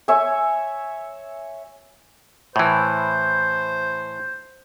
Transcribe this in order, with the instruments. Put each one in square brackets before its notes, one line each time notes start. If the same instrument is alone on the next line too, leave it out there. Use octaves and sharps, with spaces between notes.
[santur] C#5 E5 G#5
[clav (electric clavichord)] A2 E3 [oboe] C5